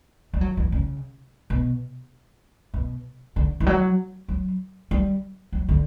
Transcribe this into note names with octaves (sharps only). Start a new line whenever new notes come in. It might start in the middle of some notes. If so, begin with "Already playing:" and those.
G3
F#3
E3
C#3
B2
B2
D3
E3
F#3
F#3
G3
F#3
D3